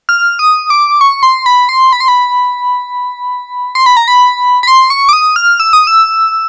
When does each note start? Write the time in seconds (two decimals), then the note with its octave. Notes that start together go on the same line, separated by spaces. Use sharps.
0.09 F6
0.39 D#6
0.70 D6
1.01 C#6
1.23 C6
1.46 B5
1.69 C6
1.93 B5
2.00 C6
2.08 B5
3.75 C6
3.86 B5
3.97 A#5
4.08 B5
4.63 B5
4.67 C6
4.90 C#6
5.09 D6
5.13 D#6
5.36 F6
5.60 E6
5.73 D#6
5.87 E6